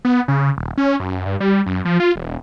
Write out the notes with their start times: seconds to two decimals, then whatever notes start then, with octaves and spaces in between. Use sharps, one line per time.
0.05 B3
0.28 C#3
0.57 D#1
0.78 C#4
1.00 F#2
1.26 G2
1.40 G3
1.66 F#2
1.85 F3
2.00 F4
2.16 E1